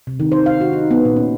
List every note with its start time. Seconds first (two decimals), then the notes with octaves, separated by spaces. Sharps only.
0.07 C3
0.20 D#3
0.32 C5
0.46 F5
0.61 F#4
0.73 D#4
0.91 B3
1.05 A#2
1.16 C#4